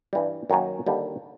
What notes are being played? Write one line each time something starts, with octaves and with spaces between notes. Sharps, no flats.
G2 E3 G3
F#2 D#3 F#3 A#3 C#4
D#2 D3 G3